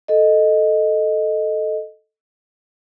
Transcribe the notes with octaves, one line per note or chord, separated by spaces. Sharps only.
A4 D#5